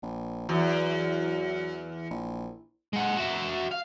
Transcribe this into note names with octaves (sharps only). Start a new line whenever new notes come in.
A#1
E2 F#3
A#1
G#3 F#5
F#4 E5
F5